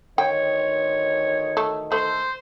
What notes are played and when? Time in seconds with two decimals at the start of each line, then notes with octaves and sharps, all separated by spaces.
0.18 D2 D#3 C#5 D#5 G5
1.57 A3
1.92 A3 C5